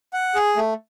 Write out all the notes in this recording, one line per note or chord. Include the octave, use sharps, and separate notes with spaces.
F#5
G#4
A3